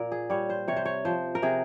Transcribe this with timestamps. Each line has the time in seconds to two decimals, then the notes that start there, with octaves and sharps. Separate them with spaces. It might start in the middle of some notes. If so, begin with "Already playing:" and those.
Already playing: A#2 A#4
0.12 G#4
0.30 G3 C#5
0.50 C5
0.68 C3 C#5
0.77 C5
0.85 C#5
1.05 F3 C5
1.35 A#4
1.42 C3 G#4